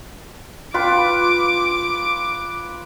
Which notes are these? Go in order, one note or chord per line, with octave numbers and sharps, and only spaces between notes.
F4 B4 G5 D6